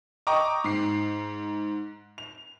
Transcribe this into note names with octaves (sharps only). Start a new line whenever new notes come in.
D#5 G5 A#5 C#6 D6
G#2 C7
F7